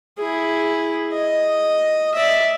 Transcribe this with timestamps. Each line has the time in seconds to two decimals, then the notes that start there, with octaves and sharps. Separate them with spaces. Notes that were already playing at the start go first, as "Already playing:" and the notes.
0.18 E4 G#4
1.13 D#5
2.14 D5 E5